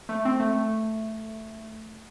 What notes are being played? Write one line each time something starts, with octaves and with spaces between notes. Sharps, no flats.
A3
C4
A3
A3